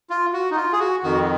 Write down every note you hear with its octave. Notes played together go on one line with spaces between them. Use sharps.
F4
F#4
D#4
F4
G#4
F#4
F2 D#3 F#4